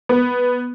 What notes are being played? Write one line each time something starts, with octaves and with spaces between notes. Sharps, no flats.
B3